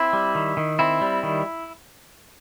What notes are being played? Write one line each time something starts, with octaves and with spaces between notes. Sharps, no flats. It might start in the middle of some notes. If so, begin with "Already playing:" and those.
Already playing: C4 E4
G3
D#3
D#3
C4 E4
G3
D#3